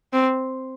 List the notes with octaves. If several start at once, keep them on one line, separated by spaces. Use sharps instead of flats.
C4